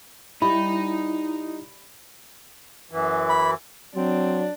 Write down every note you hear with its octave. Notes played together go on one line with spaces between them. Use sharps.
G3 D#4 E4 B5
F#2 E3
B5
F#3 C4 D4